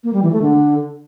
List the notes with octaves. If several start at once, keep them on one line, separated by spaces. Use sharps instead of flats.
A#3
G3
E3
A3
D3